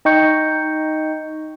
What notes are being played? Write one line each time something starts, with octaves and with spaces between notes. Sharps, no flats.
D#4 D#5 G5 C#6 G6 C#7